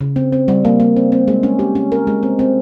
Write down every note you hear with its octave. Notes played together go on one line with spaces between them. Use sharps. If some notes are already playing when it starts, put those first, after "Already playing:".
C#3
C4
C4
G3
A#3
A#3
C4
C4
G#3
C#4
G4
C#4
A#4
G#3
C4
C4